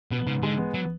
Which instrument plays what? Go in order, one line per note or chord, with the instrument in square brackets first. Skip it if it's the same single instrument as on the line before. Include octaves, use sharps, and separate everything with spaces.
[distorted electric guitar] B2 [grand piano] B3
[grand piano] G#2 [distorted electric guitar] C#3
[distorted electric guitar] D3 [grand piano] G#3
[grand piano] B3
[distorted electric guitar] F#3